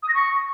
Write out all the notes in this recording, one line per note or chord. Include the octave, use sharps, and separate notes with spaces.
D#6
A#6
C#6